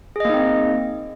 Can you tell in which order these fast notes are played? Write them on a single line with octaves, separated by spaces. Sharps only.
G#4 D#5 A#3 D#4 C4